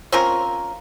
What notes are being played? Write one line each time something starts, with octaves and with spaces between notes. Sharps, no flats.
C4 C#4 F4 A#4